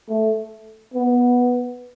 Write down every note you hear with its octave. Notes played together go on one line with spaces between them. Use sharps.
A3
B3